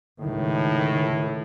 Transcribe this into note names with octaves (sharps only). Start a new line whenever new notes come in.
C#2 A2 D#3